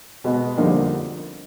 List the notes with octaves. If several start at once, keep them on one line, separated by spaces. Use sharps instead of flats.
B2 G#3 B3
F2 D3 G3 A#3 D#4